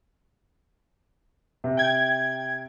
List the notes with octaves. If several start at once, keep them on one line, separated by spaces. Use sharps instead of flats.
C3
G5 G#6